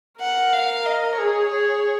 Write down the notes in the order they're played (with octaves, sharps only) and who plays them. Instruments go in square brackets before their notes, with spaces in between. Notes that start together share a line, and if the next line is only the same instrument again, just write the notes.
[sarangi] A#4 [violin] F#5
[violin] F5
D#5
[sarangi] G#4 [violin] C#5
[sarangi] G#4